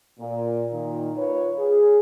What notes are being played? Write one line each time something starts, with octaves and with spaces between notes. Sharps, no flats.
A#2
A#2 D#3
F4 B4 C#5
G#4